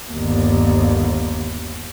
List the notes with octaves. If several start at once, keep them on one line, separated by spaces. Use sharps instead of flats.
G1 D#2